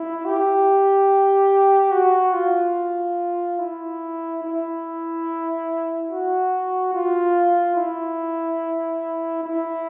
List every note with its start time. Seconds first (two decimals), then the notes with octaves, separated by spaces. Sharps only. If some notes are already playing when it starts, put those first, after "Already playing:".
Already playing: E4
0.25 G4
1.92 F#4
2.33 F4
3.59 E4
4.43 E4
6.09 F#4
6.93 F4
7.76 E4
9.43 E4